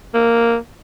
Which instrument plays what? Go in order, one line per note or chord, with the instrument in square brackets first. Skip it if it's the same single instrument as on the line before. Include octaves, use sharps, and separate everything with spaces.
[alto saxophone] A#3